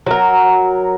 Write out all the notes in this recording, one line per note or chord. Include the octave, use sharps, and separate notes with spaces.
F#3 A#4